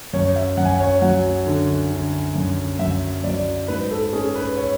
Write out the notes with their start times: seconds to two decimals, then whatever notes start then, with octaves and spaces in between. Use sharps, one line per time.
0.13 F#2 C#5
0.36 E5
0.57 F#2 F#5
0.65 G#5
0.73 F#5
0.80 C#5
1.02 F#3 F#5
1.46 D3
1.91 D3
2.35 F#2
2.79 F#2 E5
3.24 F#3 D5
3.68 G#2 B4
3.91 A4
4.13 C#4 G#4
4.35 B4
4.57 C#5